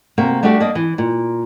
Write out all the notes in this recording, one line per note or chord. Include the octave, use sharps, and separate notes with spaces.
C3 A#3 F#4 A#4
G3 A3 D4 F#4 G4
A#3 D4 D#5
E3
A#2